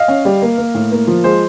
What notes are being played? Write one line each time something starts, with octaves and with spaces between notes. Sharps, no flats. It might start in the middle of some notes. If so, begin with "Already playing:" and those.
Already playing: D#5 F5
C#4
G3
A#3
A#3
A2
A#3
F3
G#3 C5